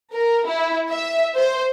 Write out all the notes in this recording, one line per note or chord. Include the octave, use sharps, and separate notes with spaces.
A#4
E4
E5
C5